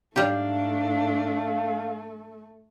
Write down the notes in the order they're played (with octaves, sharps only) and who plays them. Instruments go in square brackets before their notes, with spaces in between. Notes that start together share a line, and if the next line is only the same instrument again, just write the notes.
[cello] G#2 D4 [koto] G3 G4 [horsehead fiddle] A3 [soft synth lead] F5